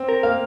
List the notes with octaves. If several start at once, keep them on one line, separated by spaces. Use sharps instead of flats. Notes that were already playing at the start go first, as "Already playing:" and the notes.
Already playing: C4
A#4
A#3 F5